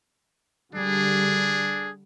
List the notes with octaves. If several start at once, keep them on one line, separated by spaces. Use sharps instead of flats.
D3 G3 D4 G#4